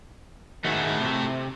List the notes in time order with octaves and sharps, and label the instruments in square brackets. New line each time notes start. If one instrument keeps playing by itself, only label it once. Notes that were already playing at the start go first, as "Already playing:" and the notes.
[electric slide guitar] D#3 F#4 G#4 [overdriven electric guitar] A3 E4
[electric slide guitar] C3